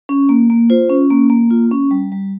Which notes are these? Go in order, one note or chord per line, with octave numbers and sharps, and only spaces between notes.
C#4
A#3
A#3
F4 C5
C#4
A#3
A#3
F4
C#4
G3
G3